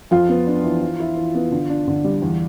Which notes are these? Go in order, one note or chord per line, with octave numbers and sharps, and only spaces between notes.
F2 F4 F5
B3
D4
E3
E3
E4
E3
B3
D3
D4
D3
G3
E2